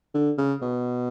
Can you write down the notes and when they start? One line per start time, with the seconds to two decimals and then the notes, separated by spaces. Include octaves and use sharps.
0.14 D3
0.38 C#3
0.62 B2